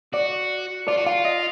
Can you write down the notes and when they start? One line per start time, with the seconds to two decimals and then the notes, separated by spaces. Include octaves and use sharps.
0.13 F#4 D5
0.88 F4 D5
0.97 F#4
1.06 F4 F5
1.25 D#5